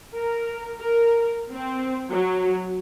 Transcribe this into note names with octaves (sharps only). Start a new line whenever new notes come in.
A#4
A#4
C4
F#3